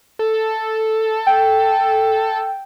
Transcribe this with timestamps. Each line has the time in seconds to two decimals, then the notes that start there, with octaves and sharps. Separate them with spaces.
0.19 A4
1.27 G5